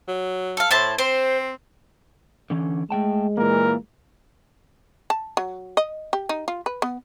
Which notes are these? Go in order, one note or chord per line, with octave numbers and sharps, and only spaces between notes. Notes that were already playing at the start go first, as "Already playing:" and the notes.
F#3
A4 F5
A2 E4 C5 A5
C4 C5
D3 E3 C#4
G#3 A3 G5 A5
A#2 E3 A#3 A#4
A5
F#3
D#5
G4
D#4
F4
B4
B3